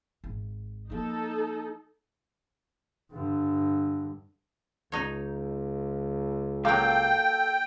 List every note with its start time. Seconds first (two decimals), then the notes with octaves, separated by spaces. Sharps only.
0.24 G#1
0.90 F3 A#3 D#4 A4
3.12 G2 D3
4.92 C#2 D#4 C#5
6.65 F#3 A#3 A4 F5 G5 D6